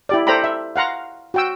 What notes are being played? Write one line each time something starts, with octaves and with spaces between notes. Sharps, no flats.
E4 G4 D5
A4 C5 D5 G5 A#5 B5
E5
F5 F#5 A#5 C6
F#4 G5 E6